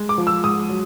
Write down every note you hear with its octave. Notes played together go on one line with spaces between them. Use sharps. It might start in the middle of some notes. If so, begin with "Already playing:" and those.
Already playing: G#3
D6
F3
E6
G#2 D#6
F#3